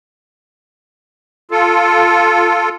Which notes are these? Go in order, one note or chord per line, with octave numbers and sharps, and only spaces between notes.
F4 A4